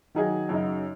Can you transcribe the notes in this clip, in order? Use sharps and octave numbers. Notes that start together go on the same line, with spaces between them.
D#3 F#3 D#4 G#4
F#2 C#3 F#3 D#4